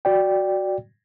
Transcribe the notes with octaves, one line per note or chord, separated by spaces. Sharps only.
F#4 D5 G5